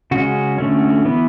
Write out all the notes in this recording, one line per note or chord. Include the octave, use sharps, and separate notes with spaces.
C#3 G#3 C#4 F#4
D3 A3 C#4
E3 B3